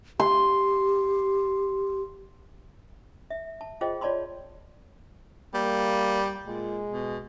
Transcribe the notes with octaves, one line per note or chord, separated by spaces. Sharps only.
G4 C6
E5
A5
F4 G#4 C5 D#5 G5
F4 C#5 D5 A5 B5 C6
G3 A#3
A#2 G#3
B2